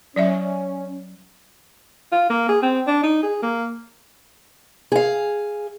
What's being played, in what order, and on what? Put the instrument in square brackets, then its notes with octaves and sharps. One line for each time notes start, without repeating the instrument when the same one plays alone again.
[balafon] F#3 D5 E5 [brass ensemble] C#4
[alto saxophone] F4
A#3
G#4
C4
D4
D#4
G#4
A#3
[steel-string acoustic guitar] G#4 F5